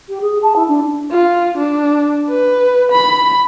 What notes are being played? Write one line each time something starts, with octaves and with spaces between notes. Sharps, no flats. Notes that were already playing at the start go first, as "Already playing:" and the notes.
G4
G#4
A5
E4
D4
F4
D4
B4
B5